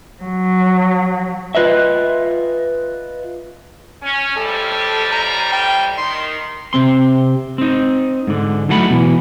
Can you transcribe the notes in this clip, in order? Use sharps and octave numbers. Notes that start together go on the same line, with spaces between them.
F#3
F4 B4 D#5 E5
C#4
F2 A2 G3 A4
A#5
G5
D#3 C6
C3 C4 C6
C4 D#4
G#2 D3
A2 F#3 A3 D#4 F#5 B5
B2 E3